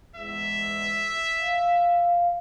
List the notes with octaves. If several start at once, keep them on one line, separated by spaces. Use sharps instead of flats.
E2 G#2 E5
F5